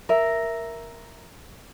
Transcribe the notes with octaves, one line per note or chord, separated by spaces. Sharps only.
A#4 E5